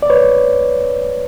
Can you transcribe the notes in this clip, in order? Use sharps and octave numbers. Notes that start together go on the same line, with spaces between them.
D5
B4 C#5